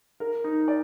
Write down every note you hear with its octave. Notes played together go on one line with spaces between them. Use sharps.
A#4
D#4
D5